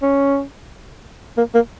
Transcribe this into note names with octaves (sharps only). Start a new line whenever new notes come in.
C#4
A#3
A#3